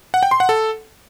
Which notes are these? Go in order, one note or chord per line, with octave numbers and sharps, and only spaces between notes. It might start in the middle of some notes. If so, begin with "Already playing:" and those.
F#5
G5
C6
F#5
A4